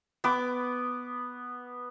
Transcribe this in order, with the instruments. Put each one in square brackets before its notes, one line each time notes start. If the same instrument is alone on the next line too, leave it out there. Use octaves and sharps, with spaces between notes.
[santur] B3 D6